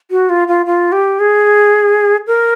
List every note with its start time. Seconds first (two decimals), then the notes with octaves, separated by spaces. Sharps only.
0.11 F#4
0.29 F4
0.48 F4
0.66 F4
0.92 G4
1.20 G#4
2.27 A#4